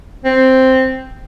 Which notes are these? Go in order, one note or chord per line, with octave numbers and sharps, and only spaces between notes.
C4